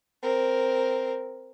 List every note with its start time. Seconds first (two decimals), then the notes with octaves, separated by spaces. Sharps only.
0.22 C4 A#4